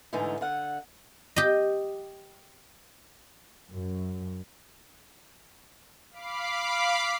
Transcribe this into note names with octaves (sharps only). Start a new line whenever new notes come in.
G#2 D3 E3 A3 D#4
D3 F5 F#5
G4 D#5
F#2
F5 B5 D6 C7